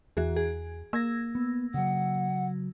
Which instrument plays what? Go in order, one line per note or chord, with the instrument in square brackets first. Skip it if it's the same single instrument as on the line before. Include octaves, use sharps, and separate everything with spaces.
[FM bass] E2 [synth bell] E3 F#4 G#4
[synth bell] G#4
[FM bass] A#3 [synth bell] E6 G#6 A#6
[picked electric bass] B3
[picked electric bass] C#3 F#3 [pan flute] F#5